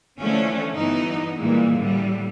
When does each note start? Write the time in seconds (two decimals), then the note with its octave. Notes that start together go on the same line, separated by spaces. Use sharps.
0.20 D3 E3 F3 A3 C#4 D4
0.76 G2 E3 B3 D#4
1.38 A#2 E3 G3 G#3 A#3
1.78 A2 D3 G3